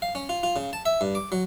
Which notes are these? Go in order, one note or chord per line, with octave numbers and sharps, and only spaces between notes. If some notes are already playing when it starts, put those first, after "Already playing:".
F5
C#4
F4
F4
C#3
A5
E5
G2
D6
F#3